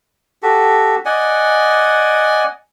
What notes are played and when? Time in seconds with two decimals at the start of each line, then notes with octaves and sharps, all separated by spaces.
0.43 F#4 G4 A4
1.05 D5 D#5 F#5 G#5